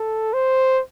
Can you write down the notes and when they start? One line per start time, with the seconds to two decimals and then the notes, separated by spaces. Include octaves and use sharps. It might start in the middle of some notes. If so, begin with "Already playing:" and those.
Already playing: A4
0.33 C5